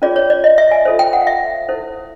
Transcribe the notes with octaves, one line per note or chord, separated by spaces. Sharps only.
C#4 F4 G#4 C#5 D5
C#5
D5
D#5
E5
G#5
F4 A4 C5
G5
F#5
F5
E5
E4 A4 C5